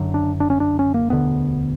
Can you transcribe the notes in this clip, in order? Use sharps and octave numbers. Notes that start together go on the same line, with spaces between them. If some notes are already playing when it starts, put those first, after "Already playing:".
Already playing: F#1 F#2 D3
D4
D4
C#4
D4
C#4
A#3
E1 D2 D3 B3